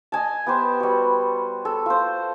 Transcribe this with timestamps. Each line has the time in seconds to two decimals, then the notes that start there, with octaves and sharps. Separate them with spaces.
0.12 D#5 G#5 A5
0.46 B3 G4 C5
0.80 G3 F#4
1.65 A4
1.86 F4 C5